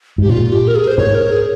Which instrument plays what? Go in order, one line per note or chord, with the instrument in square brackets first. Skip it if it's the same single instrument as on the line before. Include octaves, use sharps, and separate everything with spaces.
[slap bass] G#2 [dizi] G4
[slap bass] A#2 [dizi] F4
[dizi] G4
A#4
G#4
C5
[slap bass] G#2 [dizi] C#5
[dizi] A#4
G#4